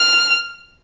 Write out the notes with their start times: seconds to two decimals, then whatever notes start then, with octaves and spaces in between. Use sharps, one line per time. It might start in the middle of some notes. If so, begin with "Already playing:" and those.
Already playing: F6